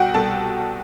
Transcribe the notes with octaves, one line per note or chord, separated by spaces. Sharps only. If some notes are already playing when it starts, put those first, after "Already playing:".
Already playing: C2 B2 G3 F#4 F#5 G5
C2 B2 G3 A4 A5